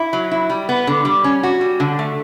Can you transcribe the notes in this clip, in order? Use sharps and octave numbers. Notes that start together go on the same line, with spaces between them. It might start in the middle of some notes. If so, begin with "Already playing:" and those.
Already playing: E4
F#3
E4
G3
B3
D3
G3
C#4
F#4
G3
D3
A3